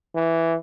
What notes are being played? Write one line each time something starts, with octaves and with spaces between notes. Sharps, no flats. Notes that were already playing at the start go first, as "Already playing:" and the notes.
E3